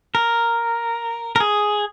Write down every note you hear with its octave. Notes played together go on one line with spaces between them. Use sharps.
A#4
A#4
G#4